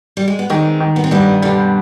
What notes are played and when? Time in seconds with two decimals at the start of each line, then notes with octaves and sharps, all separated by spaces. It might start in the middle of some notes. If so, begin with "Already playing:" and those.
0.17 G3
0.28 G#3
0.39 B3
0.50 D#3 G#3 C4
0.80 D#3
0.96 B3
1.04 C4
1.11 G2 G3 B3
1.42 B2 D3 G3